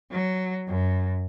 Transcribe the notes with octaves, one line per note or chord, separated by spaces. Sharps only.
F#3
F#2